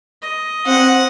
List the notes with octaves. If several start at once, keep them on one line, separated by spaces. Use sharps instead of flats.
D#5
C4 F#5